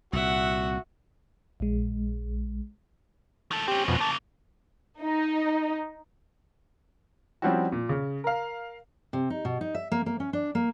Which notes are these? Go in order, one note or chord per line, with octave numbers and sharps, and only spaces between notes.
C2 A#2 F#4 E5 F#5
A#1 G#3
D#3 A4
C4 C#4 G4
F2 B2
C#3 A#3 A5
D#4
F3 G3 C4 C#4 E4 F#4
A#2
C#3
A#4 F5
C3
D#4
B2
D#4
E5
A#3
A#3
C#4
D4
A#3